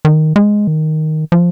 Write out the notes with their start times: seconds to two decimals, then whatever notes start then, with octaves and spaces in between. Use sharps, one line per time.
0.05 D#3
0.36 G#3
0.67 D#3
1.32 F3